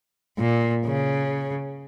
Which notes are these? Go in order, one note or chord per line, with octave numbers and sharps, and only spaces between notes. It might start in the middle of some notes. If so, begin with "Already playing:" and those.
A#2
C#3